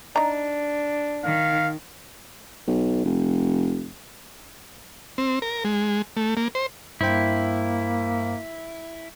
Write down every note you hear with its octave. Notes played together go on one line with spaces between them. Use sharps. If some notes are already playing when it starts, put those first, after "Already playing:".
D4 D#4 A#5
D#3 F5
B1
F1
C4
A#4
G#3
A3
A#3
C5
G2 A#3 E4 C5 G5